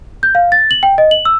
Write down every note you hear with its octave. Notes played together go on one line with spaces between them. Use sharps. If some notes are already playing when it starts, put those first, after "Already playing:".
G6
F5
A6
F#7
G5
D#5
F#7
E6